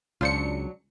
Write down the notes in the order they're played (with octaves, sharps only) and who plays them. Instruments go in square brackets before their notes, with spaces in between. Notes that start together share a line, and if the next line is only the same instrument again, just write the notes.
[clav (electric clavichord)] C#2 [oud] F#3 D4 [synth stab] F4 C5 C#7